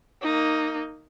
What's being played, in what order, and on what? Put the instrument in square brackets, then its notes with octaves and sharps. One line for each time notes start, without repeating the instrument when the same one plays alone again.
[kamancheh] A#3 D#4